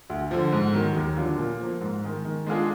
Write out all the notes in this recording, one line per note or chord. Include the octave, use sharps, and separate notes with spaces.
D2
D3 F3
G#2
D#3 F#3
D#2
D3 F#3 D4 F4
A#2
F3 A#3
G#2
D#3 G#3
D#3
G#3 D4 F4 G#4